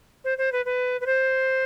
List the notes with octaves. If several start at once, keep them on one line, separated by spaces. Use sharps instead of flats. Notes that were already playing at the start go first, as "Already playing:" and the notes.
C5
C5
B4
B4
B4
C5